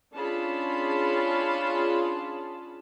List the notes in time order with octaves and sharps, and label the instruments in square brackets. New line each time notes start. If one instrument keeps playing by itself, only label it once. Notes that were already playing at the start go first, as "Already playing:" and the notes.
[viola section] C#4 D4 F4 G#4 A5 B5